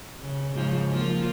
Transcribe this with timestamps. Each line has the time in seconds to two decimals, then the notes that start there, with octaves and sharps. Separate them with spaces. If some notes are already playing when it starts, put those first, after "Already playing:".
0.20 C#3
0.54 G#2 C#3 F3
0.91 F3 A#3 F4